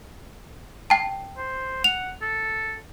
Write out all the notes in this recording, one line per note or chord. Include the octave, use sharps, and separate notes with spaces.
G5 A5
C5
F#5 F7
A4